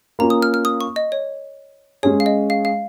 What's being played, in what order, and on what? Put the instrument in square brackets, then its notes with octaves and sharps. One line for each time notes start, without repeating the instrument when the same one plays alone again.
[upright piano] A#3 C#4 F4 [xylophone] A#5
[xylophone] D#6
F6
F6
D#6
C#6
D#5
C#5
[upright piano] G#3 C#4 G#4 [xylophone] C#5
[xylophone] F5
D#5
F5
F5